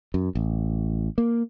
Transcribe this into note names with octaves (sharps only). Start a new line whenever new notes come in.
F#2
A1
A#3